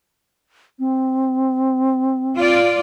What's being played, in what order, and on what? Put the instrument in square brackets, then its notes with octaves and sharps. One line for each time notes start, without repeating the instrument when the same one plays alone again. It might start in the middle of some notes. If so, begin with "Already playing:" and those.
[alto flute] C4
[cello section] F4 D5